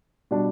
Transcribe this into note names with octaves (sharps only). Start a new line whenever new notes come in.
B2 G3 D4